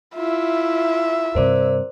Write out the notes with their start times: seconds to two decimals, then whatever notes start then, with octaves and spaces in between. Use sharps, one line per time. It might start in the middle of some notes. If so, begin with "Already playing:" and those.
0.15 E4 F4 E5
1.35 G2 C3 A#4 C5 D5